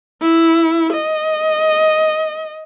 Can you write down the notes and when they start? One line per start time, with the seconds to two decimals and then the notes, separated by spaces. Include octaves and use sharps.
0.21 E4
0.93 D#5